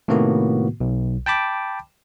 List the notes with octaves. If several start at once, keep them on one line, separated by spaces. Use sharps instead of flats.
A2 C3 D#3 A#3 B3 F#4
B1
G5 A5 B5 D6